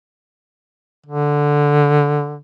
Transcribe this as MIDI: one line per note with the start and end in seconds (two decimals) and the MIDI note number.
1.06 2.41 50